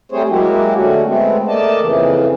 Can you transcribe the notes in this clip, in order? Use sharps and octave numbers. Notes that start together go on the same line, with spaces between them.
G3 A3 C4 G#4 C5 C#5
F#3 G#3 A#3 E4 F#4 G4
D3 A3 C#4 F#4
G#3 A3 B3 C4
A3 A#3 D5 D#5 A5
F2 C#3 E3